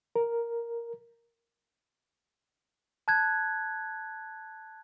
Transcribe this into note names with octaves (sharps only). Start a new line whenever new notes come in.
A#4
A5 F#6 G#6